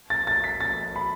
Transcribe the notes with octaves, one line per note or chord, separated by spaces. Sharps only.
A6
A6
B6
A6
B5